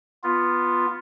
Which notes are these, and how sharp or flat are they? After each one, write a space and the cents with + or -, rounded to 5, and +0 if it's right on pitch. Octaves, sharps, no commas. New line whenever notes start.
B3 +0 F4 +0